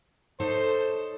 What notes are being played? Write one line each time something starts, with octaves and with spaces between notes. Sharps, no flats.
D#4 A4 C5 C#5